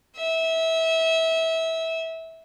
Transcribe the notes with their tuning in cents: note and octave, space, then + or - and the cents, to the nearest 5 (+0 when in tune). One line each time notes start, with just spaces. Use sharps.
E5 -20